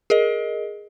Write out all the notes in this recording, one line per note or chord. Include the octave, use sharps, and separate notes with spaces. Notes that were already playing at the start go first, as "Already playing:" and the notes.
G#4 A#4 D#5